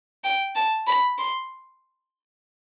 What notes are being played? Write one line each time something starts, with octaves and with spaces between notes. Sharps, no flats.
G5
A5
B5
C6